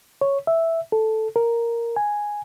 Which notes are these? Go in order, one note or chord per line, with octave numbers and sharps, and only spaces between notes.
C#5
E5
A4
A#4
G#5